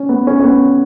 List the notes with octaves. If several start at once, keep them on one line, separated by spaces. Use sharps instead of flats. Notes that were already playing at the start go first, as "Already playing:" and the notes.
Already playing: C#4
B3
C#4
C#4
B3